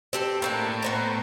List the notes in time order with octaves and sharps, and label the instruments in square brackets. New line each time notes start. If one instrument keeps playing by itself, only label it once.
[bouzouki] C4 G4 A4
[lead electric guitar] A2 [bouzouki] A#3 C4 D4
[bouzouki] B3 C5 A#5